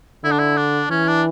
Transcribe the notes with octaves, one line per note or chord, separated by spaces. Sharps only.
D3 E4
D4
E4
D4
E3 C#4
D4